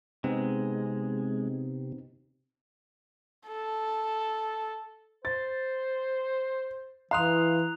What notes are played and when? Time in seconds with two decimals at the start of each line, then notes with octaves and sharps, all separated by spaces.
0.24 C3 G#3 B3 C4 D#4
3.48 A4
5.25 C5 A6
7.11 E3 F5 A#5 C6 D#6 F#6 F7